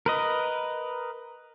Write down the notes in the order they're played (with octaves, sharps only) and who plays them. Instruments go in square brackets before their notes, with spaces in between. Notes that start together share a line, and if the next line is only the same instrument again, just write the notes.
[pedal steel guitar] A#4 B4 D#5